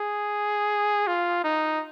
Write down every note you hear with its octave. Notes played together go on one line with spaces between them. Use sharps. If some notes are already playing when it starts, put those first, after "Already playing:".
Already playing: G#4
F4
D#4